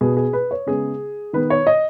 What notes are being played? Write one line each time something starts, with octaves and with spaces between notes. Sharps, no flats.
B2 B3 G#4
G#4
B4
C#5
C#3 G#3 B3 G#4
D#3 B3 B4
C#5
D#5